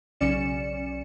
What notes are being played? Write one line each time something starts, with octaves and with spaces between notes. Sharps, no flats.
B1 C#3 C#4 D5 C#7 E7